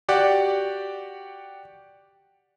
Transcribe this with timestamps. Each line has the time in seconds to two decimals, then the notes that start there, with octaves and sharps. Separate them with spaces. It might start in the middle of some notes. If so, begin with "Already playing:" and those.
0.08 F#4 G4 D5 F#5